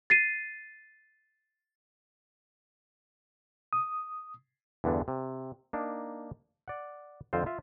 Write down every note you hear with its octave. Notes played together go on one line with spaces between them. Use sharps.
A6 C7 D#7
D#6
E2 G2 D3 B3 D4
C3
A#3 D4 D#4
D5 F#5
F2 D3 C4 F4 C5
F4 E5